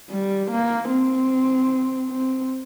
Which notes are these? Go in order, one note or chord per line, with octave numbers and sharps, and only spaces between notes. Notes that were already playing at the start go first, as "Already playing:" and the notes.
G3
A#3
C4
C4